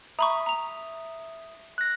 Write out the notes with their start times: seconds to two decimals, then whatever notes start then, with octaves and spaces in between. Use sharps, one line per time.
0.19 E5 A#5 B5 C#6 D#6
0.46 A#5 F7
1.78 F#6 A#6